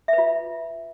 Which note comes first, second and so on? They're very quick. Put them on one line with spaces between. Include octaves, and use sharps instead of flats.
E5 B4 F4